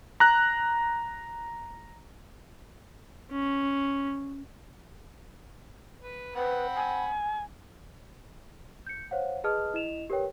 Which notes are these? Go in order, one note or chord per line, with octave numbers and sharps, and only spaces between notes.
A#5 F#6
C#4
B4
C4 B4 F#5 B5
G#5
G6 C#7
C5 C#5 F5 F#5
G#4 B4 D#5 A5 D#6 F6
E4 D#5 E7 F7
G4 A#4 B4 C#5 G5